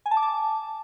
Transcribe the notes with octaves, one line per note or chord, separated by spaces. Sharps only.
G#5
A5
D6
A5